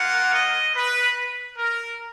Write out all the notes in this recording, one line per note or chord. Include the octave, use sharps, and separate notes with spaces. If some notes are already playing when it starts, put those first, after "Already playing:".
Already playing: A#3 F4 F#5
D#5
B4
A#4